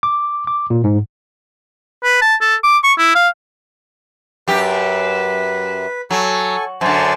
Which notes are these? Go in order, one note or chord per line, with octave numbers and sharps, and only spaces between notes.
D6
D6
A#2
G#2
B4
A5
A4
D6
C#6
E4
F5
F#2 G4 B4
F#3 A4 G#5 C#6
F#2 D3 C5 G#5 A5